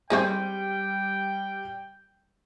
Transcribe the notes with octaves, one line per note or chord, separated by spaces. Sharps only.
G3 G#3 C4 C5 G5 D#7